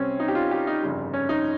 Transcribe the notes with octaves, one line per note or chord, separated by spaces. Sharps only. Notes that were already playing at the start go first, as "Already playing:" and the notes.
Already playing: C2 C3 G3 C4 C#4
D#4
G4
F4
G4
D#4
G1 F2 C#3 G3
C#4
D#4